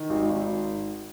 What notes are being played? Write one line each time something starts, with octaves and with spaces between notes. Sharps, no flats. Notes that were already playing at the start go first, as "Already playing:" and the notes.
Already playing: D#3
G#1
G#1